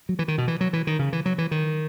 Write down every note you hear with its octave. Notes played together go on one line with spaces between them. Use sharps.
F#3
E3
D#3
B2
E3
F#3
E3
D#3
C#3
E3
F#3
E3
D#3